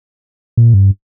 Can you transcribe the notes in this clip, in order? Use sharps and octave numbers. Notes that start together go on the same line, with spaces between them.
A#2
G2